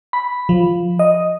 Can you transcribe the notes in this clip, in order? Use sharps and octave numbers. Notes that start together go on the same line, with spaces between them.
B5
F3
D#5